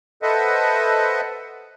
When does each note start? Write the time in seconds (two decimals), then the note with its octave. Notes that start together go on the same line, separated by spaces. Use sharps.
0.22 A4 B4 C5 D#5 E5 F#5